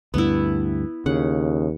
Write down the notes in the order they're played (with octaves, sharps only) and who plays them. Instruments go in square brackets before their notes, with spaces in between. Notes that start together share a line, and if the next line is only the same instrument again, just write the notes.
[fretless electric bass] D2 G2 [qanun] B3 E4
[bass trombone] D#2 [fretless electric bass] C#3 [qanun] F#5